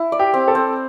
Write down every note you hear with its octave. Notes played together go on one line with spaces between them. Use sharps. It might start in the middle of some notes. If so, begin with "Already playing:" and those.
Already playing: E4
D5
G4
C4
A4
C4